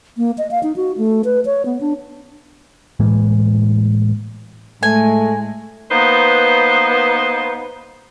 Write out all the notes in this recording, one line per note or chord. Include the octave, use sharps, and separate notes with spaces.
A#3
D#5
F5
D#4
F#4
A3
B4
C#5
B3
D4
A2 E3 G#3 A#3
A2 G#3 A3 G#5
A#3 B3 D#4 B4 C5